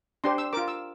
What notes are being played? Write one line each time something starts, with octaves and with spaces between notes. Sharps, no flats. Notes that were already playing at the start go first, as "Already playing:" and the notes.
D4 G4 C5 C6
E6
F4 A#4 D6
E6